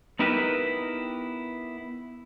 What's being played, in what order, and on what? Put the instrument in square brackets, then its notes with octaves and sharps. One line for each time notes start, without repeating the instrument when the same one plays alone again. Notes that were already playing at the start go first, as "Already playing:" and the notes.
[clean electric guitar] B3 D#4 E4 G4 A#4 B4